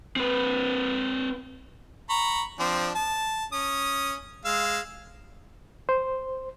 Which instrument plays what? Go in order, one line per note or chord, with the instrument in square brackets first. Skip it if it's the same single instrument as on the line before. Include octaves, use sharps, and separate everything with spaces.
[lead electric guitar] C4 B4
[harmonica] A#5 B5 C#6
F3 C4 D4
A5
C#4 D#6
G#3 F5 E6
[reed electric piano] C5